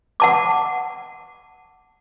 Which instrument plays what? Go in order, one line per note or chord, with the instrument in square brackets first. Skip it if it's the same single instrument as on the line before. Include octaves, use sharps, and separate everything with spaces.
[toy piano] F#5 A5 D6